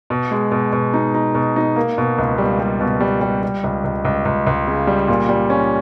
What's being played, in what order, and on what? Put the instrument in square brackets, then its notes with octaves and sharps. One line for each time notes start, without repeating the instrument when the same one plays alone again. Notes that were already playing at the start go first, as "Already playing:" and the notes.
[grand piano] B2
G#3
B2
B2
D#4
D#4
B2
D#4
A#3
B2
C#2
G3
G3
B2
G3
G3
G3
C#2
C#2
C#2
C#2
C#2
C#3
G3
A#2
G3
C#4